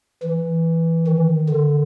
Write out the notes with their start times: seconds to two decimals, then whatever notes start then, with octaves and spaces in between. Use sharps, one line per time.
0.23 E3
1.07 D#3
1.49 D3